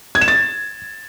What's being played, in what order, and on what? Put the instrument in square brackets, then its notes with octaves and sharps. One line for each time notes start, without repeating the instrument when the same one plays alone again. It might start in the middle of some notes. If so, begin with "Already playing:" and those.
[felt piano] G#6
E7
A6